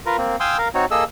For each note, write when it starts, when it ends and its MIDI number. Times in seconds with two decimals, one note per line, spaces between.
0.06 0.17 65
0.06 0.17 70
0.06 0.17 71
0.18 0.36 58
0.18 0.36 60
0.40 0.57 77
0.40 0.57 79
0.40 0.57 80
0.40 0.57 84
0.40 0.57 87
0.40 0.57 88
0.58 0.68 70
0.58 0.68 77
0.74 0.85 60
0.74 0.85 63
0.74 0.85 66
0.74 0.85 73
0.91 1.04 58
0.91 1.04 68
0.91 1.04 69
0.91 1.04 75
0.91 1.04 88